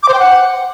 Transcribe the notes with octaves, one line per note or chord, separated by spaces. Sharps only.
D6
C5
G5
F#5